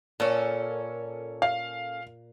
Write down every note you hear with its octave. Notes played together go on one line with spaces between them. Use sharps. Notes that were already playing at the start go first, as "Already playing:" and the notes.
A#2 C#4 A4
F5